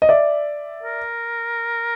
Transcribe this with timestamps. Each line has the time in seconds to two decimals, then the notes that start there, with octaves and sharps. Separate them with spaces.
0.02 D#5
0.09 D5 E5
0.83 A#4